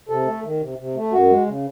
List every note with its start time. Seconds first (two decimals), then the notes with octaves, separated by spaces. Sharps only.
0.09 C3 A4
0.26 A3
0.44 D#3
0.61 C3
0.78 C3
0.95 A3
1.12 F#2 F#4
1.30 G#3
1.46 C#3